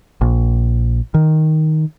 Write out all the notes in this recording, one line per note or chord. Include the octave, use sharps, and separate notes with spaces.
A#1
D#3